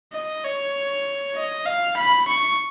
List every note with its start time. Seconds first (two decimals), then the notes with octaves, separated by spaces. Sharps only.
0.14 D#5
0.44 C#5
1.36 D#5
1.66 F5
1.97 B5
2.28 C#6